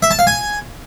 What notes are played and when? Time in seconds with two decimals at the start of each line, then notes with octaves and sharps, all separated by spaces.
0.03 E5
0.11 A5
0.19 F5
0.27 G#5